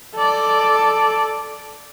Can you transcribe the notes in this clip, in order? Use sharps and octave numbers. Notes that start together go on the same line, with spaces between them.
A4 D5